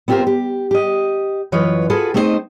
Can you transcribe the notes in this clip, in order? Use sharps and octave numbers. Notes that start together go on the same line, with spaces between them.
B3 C4 F4 G4 A#4 C5
G4
G4 D#5
F#2 E3 F4 B4 C#5 D#5
F4 F#4 G#4 A4 B4
A3 C4 D#4 F#4 C5 D#5